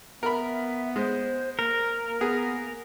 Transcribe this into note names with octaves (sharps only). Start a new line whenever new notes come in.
B3 A#4 E5 B5
G#3 C5
A#3 A#4
B3 G#4